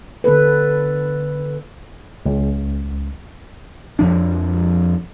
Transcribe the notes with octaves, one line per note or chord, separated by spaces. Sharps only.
D3 B3 A4 B4
C#2
F2 F3 D4